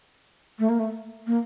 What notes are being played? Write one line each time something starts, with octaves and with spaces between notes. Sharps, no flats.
A3
A#3
A3
A#3